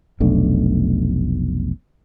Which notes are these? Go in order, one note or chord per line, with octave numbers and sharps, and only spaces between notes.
F1 B1 A3 D4